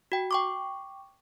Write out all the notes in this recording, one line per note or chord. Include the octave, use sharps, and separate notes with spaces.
F#4 G5
G5 C#6 D6